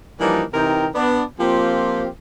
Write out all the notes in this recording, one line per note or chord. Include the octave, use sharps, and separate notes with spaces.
E3 F3 G3 A#3 D4 D#4
C3 E3 D#4 A#4 G5
B3 D4
F3 A#3 C4 F4 G4